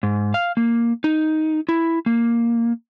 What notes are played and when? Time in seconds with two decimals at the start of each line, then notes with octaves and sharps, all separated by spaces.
0.03 G#2
0.34 F5
0.57 A#3
1.04 D#4
1.69 E4
2.06 A#3